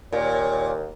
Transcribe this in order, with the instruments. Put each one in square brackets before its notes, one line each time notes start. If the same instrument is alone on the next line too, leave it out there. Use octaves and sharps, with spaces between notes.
[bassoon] D#2 [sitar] A#2 [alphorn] C#5